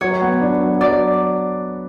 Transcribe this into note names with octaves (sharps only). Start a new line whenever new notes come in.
F#3 C#5
B3
D4
F#3
F#3 D5